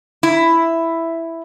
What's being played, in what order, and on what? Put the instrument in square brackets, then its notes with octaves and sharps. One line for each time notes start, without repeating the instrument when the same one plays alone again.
[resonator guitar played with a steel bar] E4